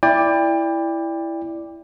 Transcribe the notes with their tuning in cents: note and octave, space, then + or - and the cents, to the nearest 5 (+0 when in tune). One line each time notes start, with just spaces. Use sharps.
E4 +5 D5 +0 G5 +30